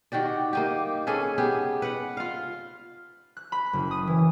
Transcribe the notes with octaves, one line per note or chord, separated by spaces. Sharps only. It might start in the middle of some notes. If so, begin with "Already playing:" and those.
D#3 F#4 G4 D5
A#3 D#4 G4
C#4 G#4 A4 B4
B3 G4 G#4
B4 F#5
F4 F5
F#6
B5
F#1
D#6
E3